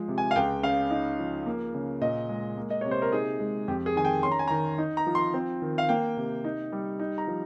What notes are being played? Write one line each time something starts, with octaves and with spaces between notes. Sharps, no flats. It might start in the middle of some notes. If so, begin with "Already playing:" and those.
Already playing: F3 G#3
C3
G#5
F5
C#2 G5
C#3 F5
D#4
F3
A#3
C#3
A#2 D#5
G#3
A#3
D#5
C3 C#5
C5
A#4
D#4 G#4
G#3
F2 G4
G#4
D#3 G#5
G5
C#4 C6
A#5
G#5
D#3 A#5
D#4
A#5
F3
C6
C4
D#3
F5
A#3 G5
C3
D#4
G3
D#4
A#5
F3